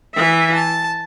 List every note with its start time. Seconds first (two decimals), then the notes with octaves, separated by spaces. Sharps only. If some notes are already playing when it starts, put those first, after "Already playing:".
0.15 E3 E5
0.55 A5